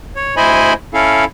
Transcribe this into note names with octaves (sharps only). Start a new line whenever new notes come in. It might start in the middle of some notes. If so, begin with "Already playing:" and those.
C#5
D2 E4 C5 D#5 G#5 B5
C#4 E4 A4 F5